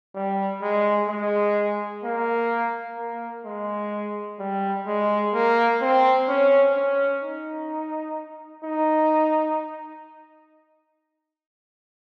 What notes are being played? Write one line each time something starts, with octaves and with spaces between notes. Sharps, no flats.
G3
G#3
G#3
A#3
A#3
G#3
G3
G#3
A#3
C4
C#4
C#4
D#4
D#4